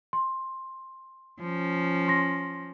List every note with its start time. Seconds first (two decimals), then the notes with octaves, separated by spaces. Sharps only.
0.13 C6
1.41 F3 C#4
2.08 C6 A#6